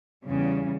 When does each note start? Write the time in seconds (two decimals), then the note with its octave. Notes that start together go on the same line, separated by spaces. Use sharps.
0.24 E2 C#3 G3